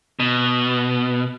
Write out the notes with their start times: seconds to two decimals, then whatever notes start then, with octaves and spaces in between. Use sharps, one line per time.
0.20 B2